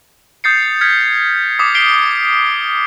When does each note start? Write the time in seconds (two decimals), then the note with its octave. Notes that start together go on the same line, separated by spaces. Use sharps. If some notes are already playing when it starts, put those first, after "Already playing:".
0.44 D#6 G6 A6 C7 C#7
0.81 F6 G#6 B6 C#7
1.59 D6 D#6 B6
1.74 B6 C7 D7 G7